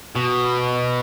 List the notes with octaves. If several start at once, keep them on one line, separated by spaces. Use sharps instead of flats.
B2